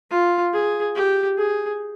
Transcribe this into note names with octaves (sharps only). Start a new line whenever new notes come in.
F4
G#4
G4
G#4